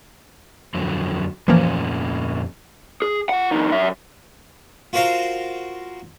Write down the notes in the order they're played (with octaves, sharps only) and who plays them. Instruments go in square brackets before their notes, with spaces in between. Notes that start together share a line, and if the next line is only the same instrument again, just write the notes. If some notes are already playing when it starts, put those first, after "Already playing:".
[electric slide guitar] F2 D3 F#3
[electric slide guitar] F2 A#2 C#4 [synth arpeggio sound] E3 F3 A#3
[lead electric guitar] G#4
F4 F#5
F2 D#3
F#2 E5
[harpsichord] F4 F#4 A#4 C5 F5 A#5